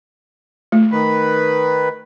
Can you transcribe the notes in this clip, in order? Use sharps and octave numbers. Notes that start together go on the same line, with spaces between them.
A3
D#3 B4